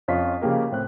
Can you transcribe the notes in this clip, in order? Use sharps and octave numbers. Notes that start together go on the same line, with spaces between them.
F2 C#4 F4 D#5 B6
C#3 F3 A#3 G4 A#4
A2 C4 F#6